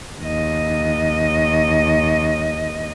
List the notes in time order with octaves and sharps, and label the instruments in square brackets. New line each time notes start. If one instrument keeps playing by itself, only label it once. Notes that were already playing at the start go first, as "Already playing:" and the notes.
[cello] D#2 D#5